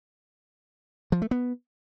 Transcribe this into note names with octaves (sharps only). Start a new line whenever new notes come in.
F3
A3
B3